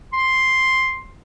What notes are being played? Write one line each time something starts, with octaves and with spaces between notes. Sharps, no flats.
C6